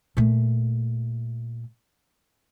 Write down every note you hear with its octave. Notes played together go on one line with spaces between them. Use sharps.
A#2 A3